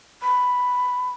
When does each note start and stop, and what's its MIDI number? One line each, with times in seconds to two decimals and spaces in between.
0.22 1.09 83